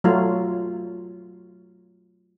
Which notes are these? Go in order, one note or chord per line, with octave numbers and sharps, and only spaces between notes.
F#3 A3 F4